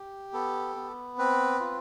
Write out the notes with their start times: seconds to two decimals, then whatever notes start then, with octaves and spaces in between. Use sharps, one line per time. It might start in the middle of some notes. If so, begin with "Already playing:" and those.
Already playing: G4
0.33 B3 A4
0.76 B3
1.18 C4 B4
1.60 F4